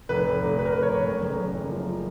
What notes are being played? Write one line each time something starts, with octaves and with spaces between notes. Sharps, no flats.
F1 B4
F1
F1
F1 B4
A#4
F1 B4
C#5
F1
F#2 A#4
F#1
F#1
F#1
F3